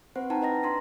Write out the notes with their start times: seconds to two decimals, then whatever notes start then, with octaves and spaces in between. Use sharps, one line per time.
0.16 C4 B4 C5 F#5
0.30 D#4 E4 F#5 G5 A5 A#5
0.42 B4 D#5 A#5 A#6
0.63 D4 A#5 C6